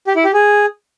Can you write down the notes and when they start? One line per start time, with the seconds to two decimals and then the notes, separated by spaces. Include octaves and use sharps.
0.07 G4
0.16 E4
0.25 G4
0.33 G#4